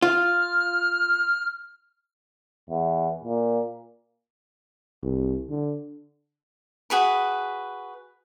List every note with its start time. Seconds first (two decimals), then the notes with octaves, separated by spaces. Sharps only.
0.02 F4 F6
2.70 E2
3.24 A#2
5.03 C2
5.50 D3
6.90 F#4 G#4 B4 B5